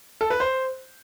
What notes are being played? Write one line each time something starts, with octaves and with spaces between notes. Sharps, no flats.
A4
B4
C5